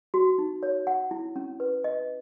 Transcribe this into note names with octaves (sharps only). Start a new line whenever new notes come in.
F#4
D#4
C#5
F#5
E4
C#4
B4
D#5